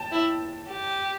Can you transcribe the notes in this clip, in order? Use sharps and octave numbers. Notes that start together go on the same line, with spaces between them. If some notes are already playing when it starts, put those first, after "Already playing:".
Already playing: G5 A5
E4
G4